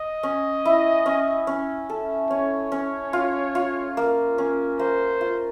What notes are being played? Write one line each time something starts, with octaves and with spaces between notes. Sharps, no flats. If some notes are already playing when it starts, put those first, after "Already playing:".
Already playing: D#5
C#4
E4
C#4
C#4
A4
C#4 C#5
C#4
F4
F4
A#3
C#4
A#3 C5
F4